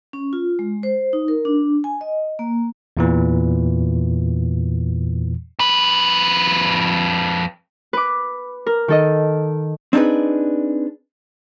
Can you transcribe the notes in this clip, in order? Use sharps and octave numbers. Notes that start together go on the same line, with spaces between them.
C#4
F4
G#3
C5
D#4
A#4
D4
G#5
D#5
A#3
E2 A#2 E3
F2 B4
B4 D6
A#4
D#3 A4 D#5
C4 D4 D#4 G#4 B4